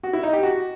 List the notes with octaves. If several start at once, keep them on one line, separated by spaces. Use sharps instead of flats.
F#4
E4
D#4
G4
F#4